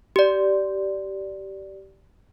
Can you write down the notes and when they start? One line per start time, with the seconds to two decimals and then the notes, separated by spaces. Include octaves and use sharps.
0.16 G4 D5